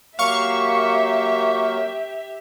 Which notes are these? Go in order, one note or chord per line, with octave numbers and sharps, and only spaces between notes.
F#3 A#3 G4 E5 F5 C#6